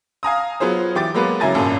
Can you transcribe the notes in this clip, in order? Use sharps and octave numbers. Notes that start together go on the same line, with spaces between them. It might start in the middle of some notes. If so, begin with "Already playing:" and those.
F5 G#5 A#5 D#6
F#3 B3 F4 G#4 C5
E3 G4 D6 A6
F#3 G#3 A#3 B3 B4
C#3 F#3 E4 G#5 A#5 A6
G#1 F#2 A#2 C#3 A4